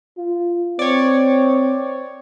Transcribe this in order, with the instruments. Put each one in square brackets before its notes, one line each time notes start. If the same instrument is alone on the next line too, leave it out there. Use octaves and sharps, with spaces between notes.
[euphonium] F4
[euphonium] C4 [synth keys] C#5 D5